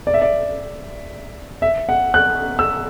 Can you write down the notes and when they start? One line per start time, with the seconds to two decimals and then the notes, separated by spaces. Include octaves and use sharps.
0.07 D5
0.14 E5
0.22 D5
1.62 E5
1.89 F#5
2.14 F#6
2.59 E6